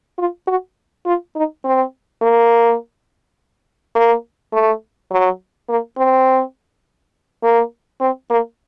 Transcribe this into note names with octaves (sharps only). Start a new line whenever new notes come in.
F4
F#4
F4
D#4
C4
A#3
A#3
A3
F#3
A#3
C4
A#3
C4
A#3